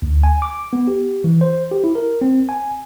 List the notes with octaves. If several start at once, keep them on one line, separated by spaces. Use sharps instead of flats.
D2
G#5
D6
B3
G4
E3
C5
G4
E4
A#4
C4
G#5